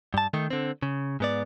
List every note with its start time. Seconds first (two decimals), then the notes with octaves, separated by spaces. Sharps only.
0.14 G2 A5
0.34 D#3 A3 D#4
0.50 D3 C4
0.82 C#3
1.20 G#2 B3 D5